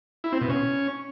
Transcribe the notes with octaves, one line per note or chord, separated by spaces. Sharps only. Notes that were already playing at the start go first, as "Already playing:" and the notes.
E4
C4
B2
C#4